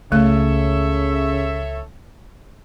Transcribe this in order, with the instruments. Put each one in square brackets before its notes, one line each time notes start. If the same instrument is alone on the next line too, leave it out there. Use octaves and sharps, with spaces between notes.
[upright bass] C#2 [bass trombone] C#3 [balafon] A3 [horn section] A4 C#5 E5